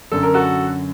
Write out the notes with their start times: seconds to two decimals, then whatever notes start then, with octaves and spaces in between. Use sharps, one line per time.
0.11 F#2 D3 A4
0.23 A#4
0.34 F#4 A4